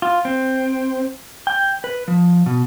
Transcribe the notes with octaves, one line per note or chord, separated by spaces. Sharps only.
F4
C4
G5
B4
F3
B2